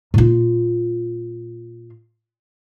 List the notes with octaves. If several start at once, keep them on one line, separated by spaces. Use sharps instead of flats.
A#2 F4